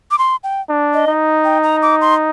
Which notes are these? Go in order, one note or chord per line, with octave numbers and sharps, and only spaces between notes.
D6
C6
G5
D4
D#5
D#4
G5
A#5
D6
C6